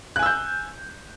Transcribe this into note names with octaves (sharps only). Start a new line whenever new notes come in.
G#5 E6 F#6 G6